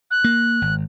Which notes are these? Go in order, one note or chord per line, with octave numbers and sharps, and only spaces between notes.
F#6
A#3
G#1